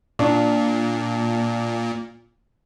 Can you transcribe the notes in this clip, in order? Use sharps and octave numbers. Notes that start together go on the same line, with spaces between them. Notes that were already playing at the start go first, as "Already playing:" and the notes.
A#2 D4